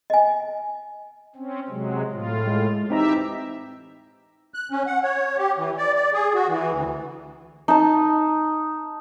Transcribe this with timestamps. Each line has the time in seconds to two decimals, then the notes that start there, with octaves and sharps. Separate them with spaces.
0.10 D#5 G#5
1.35 C4 C#4
1.69 C3 F#3 G#3
2.11 A2 F4
2.47 G#3
2.90 E3 C4 D#4 G4 E5 A#5
4.54 F#6
4.71 C#4
4.87 F#5
5.03 C#5
5.38 G4
5.58 E3
5.78 D5
5.95 D5
6.13 G#4
6.34 F#4
6.49 E3
6.72 D2
7.68 D#4 A5